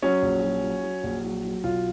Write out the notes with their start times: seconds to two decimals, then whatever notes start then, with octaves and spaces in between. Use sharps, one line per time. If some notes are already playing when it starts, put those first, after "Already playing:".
0.03 F#3 C#4
0.23 A#1
0.43 F#3
0.64 F#3
0.84 F#3
1.04 A#1
1.24 F#3
1.44 F#3
1.64 B1 F4